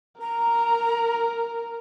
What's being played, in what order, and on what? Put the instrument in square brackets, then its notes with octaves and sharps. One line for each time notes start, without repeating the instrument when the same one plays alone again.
[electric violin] A#4 [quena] A#5